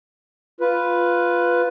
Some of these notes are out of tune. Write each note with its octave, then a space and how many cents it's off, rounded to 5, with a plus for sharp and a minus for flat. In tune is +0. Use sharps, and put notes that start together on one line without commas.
F4 +0 B4 +0